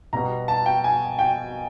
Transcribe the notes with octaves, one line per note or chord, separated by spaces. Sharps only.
B2 G3 B3 A#5
A5
G5
G#5
G5